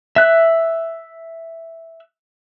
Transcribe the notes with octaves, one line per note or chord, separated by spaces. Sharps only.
E5 F#6